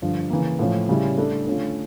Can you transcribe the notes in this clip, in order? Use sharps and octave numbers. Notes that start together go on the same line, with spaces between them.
G2 D3 F3
C#3 E3 A#3
A2 F3 C#4
C#3 G3 C#4 E4
A3 D4 A4
D3 A3 C#4 F4